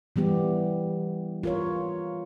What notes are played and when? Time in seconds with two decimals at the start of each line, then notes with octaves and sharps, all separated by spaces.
0.16 E3 G3 B3 G4
1.43 F4 A#4 C#5